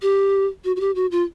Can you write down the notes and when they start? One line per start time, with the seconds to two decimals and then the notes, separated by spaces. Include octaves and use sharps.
0.02 G4
0.65 F#4
0.76 F#4
0.80 G4
0.95 F#4
1.11 F4